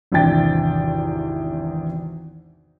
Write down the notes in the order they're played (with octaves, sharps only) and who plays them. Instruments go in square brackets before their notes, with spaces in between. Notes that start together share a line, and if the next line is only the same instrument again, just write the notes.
[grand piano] G#1 E2 C3 D4 G5 A6